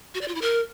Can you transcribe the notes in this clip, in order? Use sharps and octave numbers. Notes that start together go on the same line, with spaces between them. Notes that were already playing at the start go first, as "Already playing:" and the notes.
F#4
D5
F4
E4
A#4